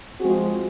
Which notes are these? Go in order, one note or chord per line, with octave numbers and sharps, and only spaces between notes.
F3 G#3 C4 F#4 G#4